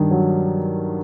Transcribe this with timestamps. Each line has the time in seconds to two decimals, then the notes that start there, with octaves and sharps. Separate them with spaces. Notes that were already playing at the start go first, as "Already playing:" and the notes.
Already playing: G2 D#3
0.11 F#3